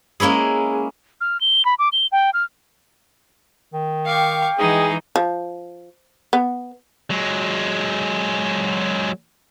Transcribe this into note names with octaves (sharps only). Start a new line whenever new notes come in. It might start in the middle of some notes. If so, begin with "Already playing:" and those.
G#3 A#3 C#4 E4 G#4
F6
G7
B5
D6
G7
G5
F6
D#3
F5 G5 C#6 D6
E3 G#3 D#4 G#4
F3
B3
F#3 G#3